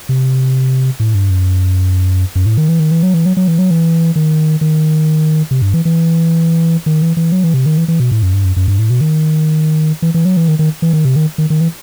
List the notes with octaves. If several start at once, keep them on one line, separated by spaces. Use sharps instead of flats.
C3
A2
G2
F#2
F#2
A2
D#3
E3
D#3
E3
F#3
E3
F#3
F#3
E3
F#3
E3
D#3
D#3
C3
G2
E3
E3
D#3
E3
E3
F#3
E3
C3
D#3
E3
E3
B2
A2
F#2
G2
F#2
F#2
G2
A2
B2
D#3
E3
E3
F#3
E3
D#3
D#3
E3
D#3
C3
D#3
D#3
D#3
E3